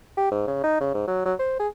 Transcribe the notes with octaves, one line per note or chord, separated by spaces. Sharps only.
G4
G#2
C#3
D#4
C#3
G#2
F#3
F#3
C5
G#4